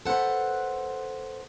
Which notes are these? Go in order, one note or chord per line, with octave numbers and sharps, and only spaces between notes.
A4 B4 C5 F#5